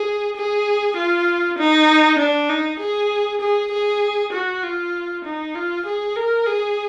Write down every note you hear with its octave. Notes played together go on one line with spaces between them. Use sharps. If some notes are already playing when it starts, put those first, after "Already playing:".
Already playing: G#4
G#4
F4
D#4
D4
D#4
G#4
G#4
G#4
F#4
F4
D#4
F4
G#4
A#4
G#4